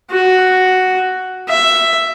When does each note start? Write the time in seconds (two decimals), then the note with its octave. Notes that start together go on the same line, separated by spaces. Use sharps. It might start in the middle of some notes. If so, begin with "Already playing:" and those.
0.11 F#4
1.49 E5